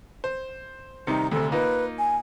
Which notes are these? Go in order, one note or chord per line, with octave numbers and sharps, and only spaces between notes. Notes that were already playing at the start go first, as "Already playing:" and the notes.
C5
C3 D#3 G3 D#4
D2 C3 A4
A#3 D#4 F4 B4
G#5